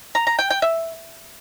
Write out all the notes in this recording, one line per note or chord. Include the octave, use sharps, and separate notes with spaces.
A#5
A#5
G5
G5
E5